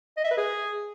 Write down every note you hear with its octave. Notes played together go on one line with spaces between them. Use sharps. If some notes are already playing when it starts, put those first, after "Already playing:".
D#5
E5
B4
G#4